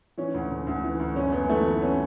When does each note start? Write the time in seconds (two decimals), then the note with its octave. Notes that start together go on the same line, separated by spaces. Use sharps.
0.18 E3 C#4
0.34 D2
0.51 C#3
0.67 D2
0.84 E3
0.99 D2
1.16 F#2 C#4
1.32 F#2 B3
1.49 E3 A3
1.65 E3 B3
1.82 C#4